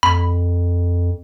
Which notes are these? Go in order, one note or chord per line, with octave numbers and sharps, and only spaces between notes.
F2 B5